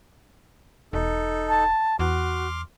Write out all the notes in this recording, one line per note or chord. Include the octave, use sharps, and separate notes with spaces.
E1 D#4 A4
A5
E2 F#4 C6 D6 F6